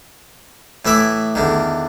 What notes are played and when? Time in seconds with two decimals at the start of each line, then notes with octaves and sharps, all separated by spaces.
0.85 A2 E3 E4 E5 D6
1.35 E2 D3 D#3